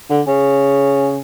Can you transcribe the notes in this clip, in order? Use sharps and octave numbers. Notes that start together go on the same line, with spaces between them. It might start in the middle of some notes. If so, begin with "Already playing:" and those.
D3
C#3